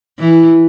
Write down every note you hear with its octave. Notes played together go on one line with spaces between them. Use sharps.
E3